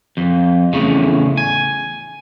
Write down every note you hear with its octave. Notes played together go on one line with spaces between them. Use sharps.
F2
E2 A2 C#3
G#5